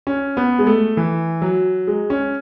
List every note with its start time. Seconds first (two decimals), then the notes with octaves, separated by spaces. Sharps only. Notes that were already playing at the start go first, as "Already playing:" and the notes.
0.07 C#4
0.37 B3
0.59 G#3
0.67 A3
0.97 E3
1.42 F#3
1.87 G#3
2.10 C#4